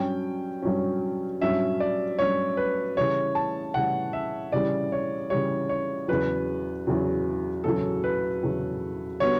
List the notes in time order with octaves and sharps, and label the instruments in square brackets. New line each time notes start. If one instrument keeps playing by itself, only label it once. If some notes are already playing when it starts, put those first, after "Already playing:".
Already playing: [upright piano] G2 F#3 C#4 [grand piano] G5
[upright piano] G2 F#3 C#4
[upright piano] G2 F#3 C#4 [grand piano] E5
[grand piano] D5
[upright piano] G2 F#3 C#4 [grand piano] C#5
[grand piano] B4
[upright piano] C#3 E3 G3 [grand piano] C#5
[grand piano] A5
[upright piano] C#3 E3 G3 [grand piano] F#5
[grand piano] E5
[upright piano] C#3 E3 G3 [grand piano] D5
[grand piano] C#5
[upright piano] C#3 E3 G3 [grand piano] C#5
[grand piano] C#5
[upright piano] E2 C#3 F#3 [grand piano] B4
[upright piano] E2 C#3 F#3
[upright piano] E2 C#3 F#3 [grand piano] A4
[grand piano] B4
[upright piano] E2 C#3 F#3
[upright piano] D3 G3 B3 F#4 [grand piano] C#5